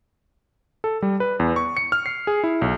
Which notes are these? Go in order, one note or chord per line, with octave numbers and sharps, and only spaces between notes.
A4
G3
B4
E2
C#6
C#7
F6
C7
G#4
E4
B1